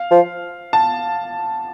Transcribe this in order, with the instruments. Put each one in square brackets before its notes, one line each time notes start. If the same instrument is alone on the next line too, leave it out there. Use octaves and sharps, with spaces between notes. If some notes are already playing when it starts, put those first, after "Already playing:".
Already playing: [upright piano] F5
[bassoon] F3
[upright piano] A5